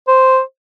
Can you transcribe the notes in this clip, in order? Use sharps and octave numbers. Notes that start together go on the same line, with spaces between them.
C5